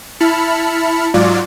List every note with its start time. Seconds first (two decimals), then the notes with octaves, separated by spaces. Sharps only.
0.20 E4 A5 B5 F6 C#7
1.14 G#2 F#3 F4 D5